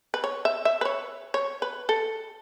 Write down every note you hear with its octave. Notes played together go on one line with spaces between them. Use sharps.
B4
C#5
E5
E5
B4
C#5
C#5
B4
A4